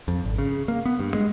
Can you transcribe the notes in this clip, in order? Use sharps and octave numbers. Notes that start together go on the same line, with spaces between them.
F2
G#1
C#3
A#3
B3
G2
G#3